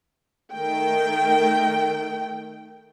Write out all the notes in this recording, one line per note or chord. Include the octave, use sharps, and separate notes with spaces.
D#3 A3 G5